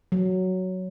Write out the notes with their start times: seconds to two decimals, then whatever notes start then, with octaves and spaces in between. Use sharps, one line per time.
0.12 F#3